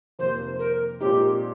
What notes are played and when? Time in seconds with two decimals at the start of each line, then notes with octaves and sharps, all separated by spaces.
0.19 F2 C3 D#3 A#3 C5
0.59 A#4
1.01 A#2 G#3 C4 D#4 G4